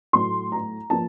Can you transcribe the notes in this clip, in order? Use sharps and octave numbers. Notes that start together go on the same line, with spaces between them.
A2 F#3 A3 C6
A#5
F3 A#3 A5